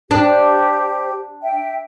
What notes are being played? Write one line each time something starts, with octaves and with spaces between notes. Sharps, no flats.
D4 G4 C5
E5 G5